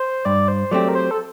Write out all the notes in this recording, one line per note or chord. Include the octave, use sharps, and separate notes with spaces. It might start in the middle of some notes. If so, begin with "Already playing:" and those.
Already playing: C5
G2 D5
C5
F#3 A3 C4 G4 D5
A#4
C5
A4